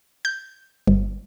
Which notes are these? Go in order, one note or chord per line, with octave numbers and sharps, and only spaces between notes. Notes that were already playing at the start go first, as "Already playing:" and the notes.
G6
G1